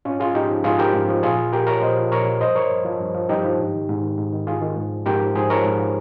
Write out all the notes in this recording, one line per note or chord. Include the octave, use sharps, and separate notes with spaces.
G#2 C#4 F4
F3 F4 G#4
G#2 D#4 G4
F3
G#2 F4 G#4
F3 G4 A#4
G#2
F3
A#2 F4 G#4
F3
A#2 G4 A#4
F3 A#4 C#5
A#2 C5 D#5
F3
A#2 A#4 C#5
F3
G2 C5 D#5
F3 A#4 C#5
G2
F3
G2
F3
G2 D#4 G4
F3
G#2
D#3
G#2
D#3
G#2
D#3
G#2 F4 G#4
D#3
G#2
F3
G#2 G4 A#4
F3
G#2 G#4 C5
F3 A#4 C#5
G#2
F3